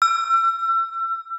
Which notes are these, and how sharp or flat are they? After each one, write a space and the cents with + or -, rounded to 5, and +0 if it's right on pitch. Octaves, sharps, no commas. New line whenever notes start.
E6 +35